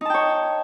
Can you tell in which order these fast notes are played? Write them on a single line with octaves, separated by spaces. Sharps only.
D#4 A5 G5 C#5